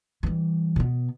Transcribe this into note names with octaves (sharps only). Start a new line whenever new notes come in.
E3 G3
B2 B3